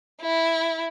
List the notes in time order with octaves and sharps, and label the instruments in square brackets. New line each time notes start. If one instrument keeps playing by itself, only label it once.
[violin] E4